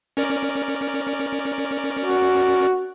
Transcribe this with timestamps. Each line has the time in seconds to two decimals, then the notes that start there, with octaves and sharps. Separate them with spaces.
0.17 C#4 A#4 D5
1.98 F#4